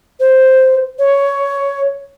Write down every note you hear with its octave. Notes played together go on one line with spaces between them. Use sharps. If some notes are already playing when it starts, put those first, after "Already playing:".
C5
C#5